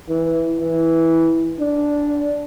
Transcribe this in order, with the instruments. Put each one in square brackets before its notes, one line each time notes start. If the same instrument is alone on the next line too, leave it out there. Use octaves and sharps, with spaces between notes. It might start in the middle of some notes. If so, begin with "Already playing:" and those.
[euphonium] E3
E3
D4